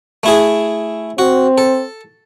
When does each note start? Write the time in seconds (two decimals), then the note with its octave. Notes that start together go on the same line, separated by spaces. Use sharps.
0.23 A3 E4 G#4
1.18 C4 F#4
1.58 A4